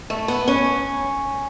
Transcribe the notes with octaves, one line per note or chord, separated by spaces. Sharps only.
A3
B3
C#4